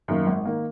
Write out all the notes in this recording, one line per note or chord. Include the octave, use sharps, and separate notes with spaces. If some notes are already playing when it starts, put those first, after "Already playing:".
F#2 D#3 A#3
G#1
D#3 A#3